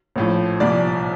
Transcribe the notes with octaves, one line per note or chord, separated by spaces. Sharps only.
A#1 A2 F3
C2 A#2 F3 D5